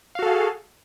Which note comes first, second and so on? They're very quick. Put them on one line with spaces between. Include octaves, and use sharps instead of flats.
F5 F#4 A4 G#4